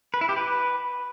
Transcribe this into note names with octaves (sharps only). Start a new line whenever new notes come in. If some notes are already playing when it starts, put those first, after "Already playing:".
B4
E4
G4
B4